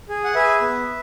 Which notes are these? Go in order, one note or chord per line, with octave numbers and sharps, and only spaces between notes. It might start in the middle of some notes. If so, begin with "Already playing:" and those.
G#4
F#5
G#4 B4 E5
B3